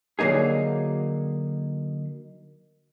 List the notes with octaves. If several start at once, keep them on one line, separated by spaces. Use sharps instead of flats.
D3 F#3 A#3 D#4 G#4